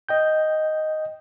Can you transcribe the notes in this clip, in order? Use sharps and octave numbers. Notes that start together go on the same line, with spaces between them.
D#5 G5 G6